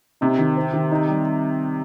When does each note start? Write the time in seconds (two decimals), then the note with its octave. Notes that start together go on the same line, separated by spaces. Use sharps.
0.21 C3 D#4
0.38 D#3
0.57 C4
0.73 D#3
0.91 D#4
1.09 G3